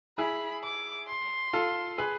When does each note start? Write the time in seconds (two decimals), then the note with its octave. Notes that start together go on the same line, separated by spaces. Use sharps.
0.18 E4 G#4 B5
0.64 D6
1.08 C6
1.53 F4 A4
1.98 G#4 B4